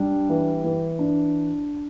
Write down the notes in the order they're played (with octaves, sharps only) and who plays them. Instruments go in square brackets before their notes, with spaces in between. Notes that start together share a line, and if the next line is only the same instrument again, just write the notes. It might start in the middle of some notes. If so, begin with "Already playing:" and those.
Already playing: [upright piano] G3 D4
E3
E3
D4